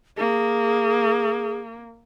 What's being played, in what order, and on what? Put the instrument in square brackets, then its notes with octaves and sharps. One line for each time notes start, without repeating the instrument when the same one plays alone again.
[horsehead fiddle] A#3 [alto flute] G#4